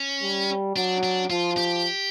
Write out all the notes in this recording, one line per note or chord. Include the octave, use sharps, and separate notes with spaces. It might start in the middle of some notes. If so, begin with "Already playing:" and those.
Already playing: C#4
G3
F#3 D4
D4
F3 F4
G4